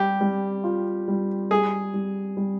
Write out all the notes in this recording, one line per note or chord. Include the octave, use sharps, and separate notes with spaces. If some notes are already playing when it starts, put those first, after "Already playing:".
Already playing: G3 G4
G3
F4
G3
G3 G#4
G3
G3